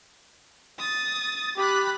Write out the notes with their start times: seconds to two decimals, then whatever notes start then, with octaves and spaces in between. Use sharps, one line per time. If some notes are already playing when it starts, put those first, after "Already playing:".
0.79 D#6 A6
1.57 G4 B5 F#6